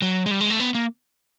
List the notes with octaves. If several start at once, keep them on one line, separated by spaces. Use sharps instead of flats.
F#3
G#3
G3
G#3
A3
B3
A#3